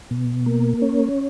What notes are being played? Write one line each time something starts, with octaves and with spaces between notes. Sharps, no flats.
B2
A#3
C#4